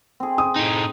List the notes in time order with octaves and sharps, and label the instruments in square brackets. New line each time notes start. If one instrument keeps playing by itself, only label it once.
[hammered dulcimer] C4 G#4
[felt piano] D#6
[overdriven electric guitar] A2 D#4